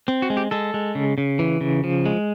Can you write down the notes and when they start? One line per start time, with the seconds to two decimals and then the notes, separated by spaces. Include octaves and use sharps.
0.08 C4
0.22 F#4
0.30 G#3
0.37 G4
0.51 G#3 A4
0.74 G#3
0.95 C#3
1.18 C#3
1.39 E3
1.61 C#3
1.84 F3
2.06 G#3